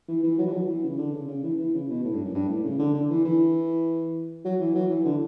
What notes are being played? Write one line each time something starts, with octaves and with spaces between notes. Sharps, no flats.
E3
E3
F#3
E3
F#3
E3
C#3
D3
C#3
C#3
E3
E3
C#3
B2
A2
G2
F#2
G2
A2
C#3
D3
D3
E3
E3
F#3
E3
F#3
E3
D3